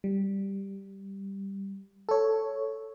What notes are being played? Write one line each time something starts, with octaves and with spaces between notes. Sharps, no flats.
G3
A4 C#5